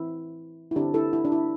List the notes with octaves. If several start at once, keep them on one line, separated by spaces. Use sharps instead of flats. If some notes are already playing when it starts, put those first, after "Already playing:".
Already playing: E3 C4 E4
E4
D3 C4 D4 G4
E4 A4
E4
D4
E4